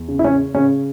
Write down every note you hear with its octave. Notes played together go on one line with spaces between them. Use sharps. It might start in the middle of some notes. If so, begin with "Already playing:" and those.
Already playing: E2
C#3
E4
C#4
C#3 C#4